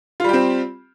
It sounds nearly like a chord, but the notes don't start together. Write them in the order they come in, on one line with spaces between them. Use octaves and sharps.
F4 G3 G4 C4